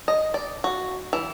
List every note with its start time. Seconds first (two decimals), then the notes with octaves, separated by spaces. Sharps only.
0.08 D#5
0.34 D5
0.64 F#4
1.13 E3